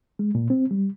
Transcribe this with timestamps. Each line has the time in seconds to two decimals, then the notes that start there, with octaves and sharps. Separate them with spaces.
0.19 G#3
0.35 A#2
0.50 C4
0.71 G3